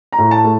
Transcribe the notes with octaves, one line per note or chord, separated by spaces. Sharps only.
A#5
A2
A5
A3